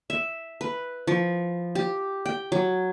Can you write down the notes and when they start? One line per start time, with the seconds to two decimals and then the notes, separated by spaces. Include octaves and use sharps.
0.10 E5
0.61 B4
1.07 F3
1.75 G4
2.26 G5
2.52 F#3